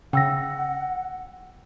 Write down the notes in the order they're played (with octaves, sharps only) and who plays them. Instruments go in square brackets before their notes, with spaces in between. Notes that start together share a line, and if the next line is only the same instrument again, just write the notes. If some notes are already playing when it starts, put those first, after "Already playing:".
[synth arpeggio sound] C#3 [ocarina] F#5 [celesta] G5 E6 A#6